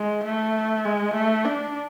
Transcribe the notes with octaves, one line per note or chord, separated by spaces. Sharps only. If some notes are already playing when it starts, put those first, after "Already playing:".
Already playing: G#3
A3
G#3
A3
D4